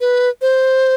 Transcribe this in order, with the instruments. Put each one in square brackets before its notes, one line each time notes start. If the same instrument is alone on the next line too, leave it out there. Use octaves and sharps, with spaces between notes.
[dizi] B4
C5